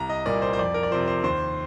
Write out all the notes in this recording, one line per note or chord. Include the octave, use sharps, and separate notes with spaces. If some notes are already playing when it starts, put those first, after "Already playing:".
Already playing: C2 A#5
D#5
A#2 G3 A#3 D5
C5
C5
F2 D5
A#4
D5
C3 F3 C5
C5
D#2 C5